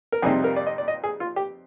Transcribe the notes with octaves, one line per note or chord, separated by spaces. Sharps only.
A#4
F2 C3 G3 C4 D#4 G#4
A#4
D5
D#5
D5
D#5
G#4
F4
G4